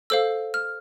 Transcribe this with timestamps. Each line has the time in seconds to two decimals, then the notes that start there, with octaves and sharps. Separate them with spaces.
0.10 A4 C5 F5 E6
0.54 F6